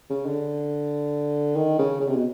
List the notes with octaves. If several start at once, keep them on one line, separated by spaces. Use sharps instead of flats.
C#3
D3
D#3
C#3
C#3
C3
B2